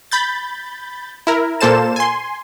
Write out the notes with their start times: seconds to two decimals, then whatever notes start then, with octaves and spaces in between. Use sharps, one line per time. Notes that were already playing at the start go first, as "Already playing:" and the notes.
0.12 B5 G6 A6
1.27 E4 A#4
1.61 A#2 A#3 A4 C5 A5 E7
1.96 G#5 C6